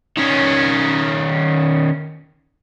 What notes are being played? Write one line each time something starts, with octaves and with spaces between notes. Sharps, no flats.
D#3 C#4